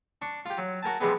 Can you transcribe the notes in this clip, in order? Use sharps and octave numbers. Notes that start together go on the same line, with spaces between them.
D4 C#6
F4 G4
F#3
F#4 A#4 G#5 A5
C3 F3 G3 G#3 B3